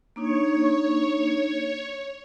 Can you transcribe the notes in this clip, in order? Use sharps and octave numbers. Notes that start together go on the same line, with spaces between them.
A#3 D4 D#4 C#5